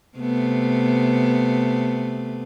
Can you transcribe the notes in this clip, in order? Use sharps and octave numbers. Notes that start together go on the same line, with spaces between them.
C3 A3 B3